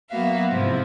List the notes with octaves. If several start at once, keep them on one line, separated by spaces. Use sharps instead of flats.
F#3 A#3 B3 F#4 E5 F5
G#2 C3 F3 E4